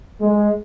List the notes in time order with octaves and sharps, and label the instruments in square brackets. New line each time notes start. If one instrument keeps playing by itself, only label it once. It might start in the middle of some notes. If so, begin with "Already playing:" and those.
[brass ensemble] G#3